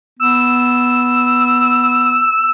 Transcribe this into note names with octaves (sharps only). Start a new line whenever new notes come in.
B3 E6